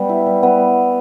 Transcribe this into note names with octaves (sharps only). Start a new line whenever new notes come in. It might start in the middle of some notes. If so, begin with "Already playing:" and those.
Already playing: G3 B3
E4
G3
B3